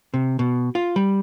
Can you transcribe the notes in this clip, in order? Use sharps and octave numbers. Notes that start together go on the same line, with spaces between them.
C3
B2
F4
G3